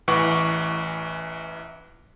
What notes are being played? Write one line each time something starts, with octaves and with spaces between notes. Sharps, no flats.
A1 E3 F#5 C#6 D6